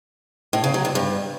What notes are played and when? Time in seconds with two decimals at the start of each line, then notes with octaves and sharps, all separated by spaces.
0.53 A2
0.64 C#3
0.74 F#3
0.85 G2
0.95 G2